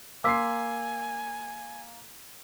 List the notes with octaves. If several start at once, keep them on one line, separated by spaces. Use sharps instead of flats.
A#3 G#5 C6 D6 E6 B6 C7